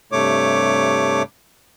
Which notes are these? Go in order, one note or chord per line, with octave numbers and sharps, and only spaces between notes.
G2 C3 A3 C#5 D6